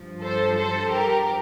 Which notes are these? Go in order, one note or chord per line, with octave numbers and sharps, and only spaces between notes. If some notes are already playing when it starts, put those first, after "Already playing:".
Already playing: G2 F3
A4 C5
A4 C5
G4 A#4